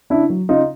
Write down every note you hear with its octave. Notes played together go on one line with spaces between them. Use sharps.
C#3 D4 E4
F#3
C#3 D#4 F4